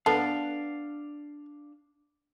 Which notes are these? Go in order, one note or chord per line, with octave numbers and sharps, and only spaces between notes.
B3 D4 A4 F5